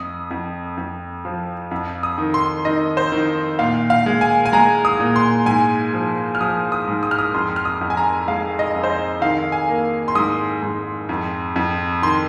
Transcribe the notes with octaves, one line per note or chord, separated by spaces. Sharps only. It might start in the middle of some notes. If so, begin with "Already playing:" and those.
Already playing: F2 D#6
F2
F2
F3
F2
D#6
D#3
C6
D#3 D#5
C5
D#3
A#2 F5
F5
G#3
G#5
G#5
G#3 A#5
D#6
A#2
C6
G#2 G#5
F3
F6
F3 D#6
D#6
G#2
D#6
F6
D#6
F2 C6
F6
D#6
F2
G#5
A#5
G#3 F5
D#5
F2
C5
D#5
D#3 F5
G#5
A#3
C6
G#2 D#6
G#2
F2
F2
D#3 C6